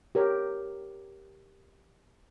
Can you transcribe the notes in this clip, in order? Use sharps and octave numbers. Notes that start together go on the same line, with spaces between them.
G4 A#4 C#5